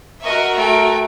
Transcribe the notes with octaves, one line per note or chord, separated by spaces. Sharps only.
F#4 A#4 D#5 E5 C#6
A3 G5